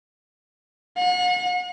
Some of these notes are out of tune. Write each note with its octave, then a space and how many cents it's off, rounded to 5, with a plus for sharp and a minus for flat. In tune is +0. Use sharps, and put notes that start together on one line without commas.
F#5 -40